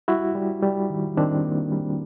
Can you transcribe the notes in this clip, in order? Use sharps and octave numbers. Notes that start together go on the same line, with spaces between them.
G3 E4 F#4
G3
G3
D#3
D#3 C4 D4
A#3
G3